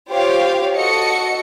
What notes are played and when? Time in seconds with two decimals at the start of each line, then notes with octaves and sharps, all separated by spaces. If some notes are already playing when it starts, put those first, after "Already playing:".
0.11 F4 G4 C5 C#5 F5 G5
0.76 F#4 A4 D#5 C#7